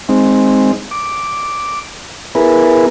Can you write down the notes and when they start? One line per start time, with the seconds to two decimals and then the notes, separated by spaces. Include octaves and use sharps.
0.09 G#3 C4 D#4
0.91 D6
2.35 B3 E4 G#4 A#4 B4